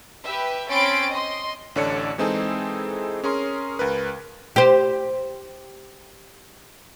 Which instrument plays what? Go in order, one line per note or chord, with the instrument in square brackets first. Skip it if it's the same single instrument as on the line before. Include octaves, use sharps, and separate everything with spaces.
[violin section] G4 B4 E5
C4 C#4 B5 C6 A6 D7
D#5 C6
[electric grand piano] A1 D3 A4 C#5 D5 C#7
E3 G#3 C4 D#4 G#4 A4
C#4 G#4 A#4 C6
C#2 A#4 B4
[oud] G4 C5